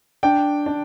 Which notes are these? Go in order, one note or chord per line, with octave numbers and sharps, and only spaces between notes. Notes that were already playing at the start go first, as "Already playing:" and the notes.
D4 G5
D4